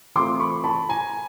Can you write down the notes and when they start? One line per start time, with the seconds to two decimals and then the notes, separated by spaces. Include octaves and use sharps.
0.15 E3 A3 C4 F4 C6 D6
0.40 B5 C#6
0.64 A5 B5
0.89 G#5 A#5